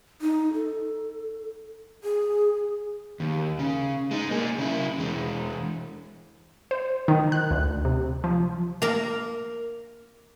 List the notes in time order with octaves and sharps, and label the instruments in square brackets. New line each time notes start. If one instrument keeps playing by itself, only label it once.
[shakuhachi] D#4
A4
G#4
[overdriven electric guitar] D#2
C#3
G#3 D#4
A#3 G#4
C#3 E4
E2 G#3
[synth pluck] C5
D#3
F#6
D2
C3
F3
[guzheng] A#3 A#4